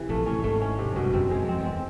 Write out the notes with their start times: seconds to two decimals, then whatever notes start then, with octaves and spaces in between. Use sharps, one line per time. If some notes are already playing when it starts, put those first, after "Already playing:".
Already playing: C3 E3
0.09 A#1 A#2 A3
0.26 A1 A2 C#4
0.44 G#1 G#2 A3
0.62 C#4
0.79 C3
0.92 F#2
0.96 G1 G2 B2
1.13 F#1 F#2 C4
1.31 F#2 G#3
1.45 F2 C4
1.59 E2
1.65 C4